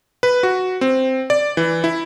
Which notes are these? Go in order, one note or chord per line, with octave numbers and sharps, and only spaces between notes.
B4
F#4
C4
D5
E3
E4